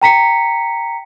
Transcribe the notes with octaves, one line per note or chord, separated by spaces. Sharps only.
G5 A#5 B6 C#7